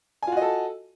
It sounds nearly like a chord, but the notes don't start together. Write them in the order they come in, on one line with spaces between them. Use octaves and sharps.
G#5 F4 F#4 D#5 A4